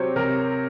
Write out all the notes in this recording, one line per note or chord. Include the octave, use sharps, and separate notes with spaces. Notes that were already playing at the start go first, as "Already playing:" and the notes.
Already playing: C3 F#3 C5 C#5
C3 A#4